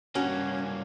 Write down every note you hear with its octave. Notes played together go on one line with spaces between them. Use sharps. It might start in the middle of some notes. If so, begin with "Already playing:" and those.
G2 A#3 C#4 F#4